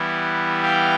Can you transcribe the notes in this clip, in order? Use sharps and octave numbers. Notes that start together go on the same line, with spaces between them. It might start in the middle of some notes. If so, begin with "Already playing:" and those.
Already playing: E3 G3 B3 E4
F5 G5